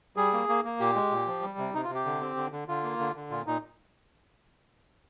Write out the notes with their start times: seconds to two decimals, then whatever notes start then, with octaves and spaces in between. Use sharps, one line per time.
0.17 G3 G#4
0.33 A#3
0.49 A#3
0.65 A#3
0.80 A#2 G4
0.95 G#3
1.11 A#2
1.27 F3
1.42 G3
1.58 C3
1.74 C3 D#4
1.84 F4
1.89 C3
1.95 G4
2.05 D3
2.21 C4
2.37 D3
2.52 D3
2.68 D3 F4
2.83 A#3
2.99 D3
3.15 D3
3.30 A#2 F4
3.46 A#2 D#4